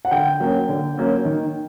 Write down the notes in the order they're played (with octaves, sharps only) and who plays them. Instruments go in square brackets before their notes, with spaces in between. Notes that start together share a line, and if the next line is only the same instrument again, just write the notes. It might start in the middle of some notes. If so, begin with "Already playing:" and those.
[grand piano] F#5
D3 G5
F#3 A#3 C#4
D3
F#3 A#3 C#4
D#3